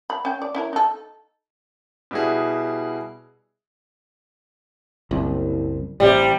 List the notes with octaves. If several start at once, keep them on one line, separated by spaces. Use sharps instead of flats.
B5
C#4 G5
D5
C#4 E4 A#4
D#4 A4
B2 G3 E4 F#4 G#4
F#1 C2
A1 C3 G3